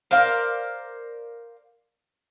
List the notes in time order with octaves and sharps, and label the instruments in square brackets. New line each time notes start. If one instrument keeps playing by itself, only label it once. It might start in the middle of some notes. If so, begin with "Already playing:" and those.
[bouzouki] A#4 C5 D5 F5